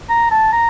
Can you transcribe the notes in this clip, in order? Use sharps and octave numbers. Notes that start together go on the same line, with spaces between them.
A#5
A5
A#5